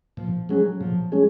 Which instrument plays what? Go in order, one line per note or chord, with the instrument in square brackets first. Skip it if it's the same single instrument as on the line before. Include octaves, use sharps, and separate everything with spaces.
[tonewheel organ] A#2 [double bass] F3
[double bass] F#3 [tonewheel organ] G#3 C#4 G#4
[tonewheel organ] A#2 [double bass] F3
[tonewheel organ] G#3 C#4 G#4